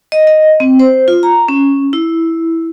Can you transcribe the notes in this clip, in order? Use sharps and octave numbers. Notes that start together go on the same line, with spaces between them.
D#5
D#5
C4
C5
F4
A#5
C#4
E4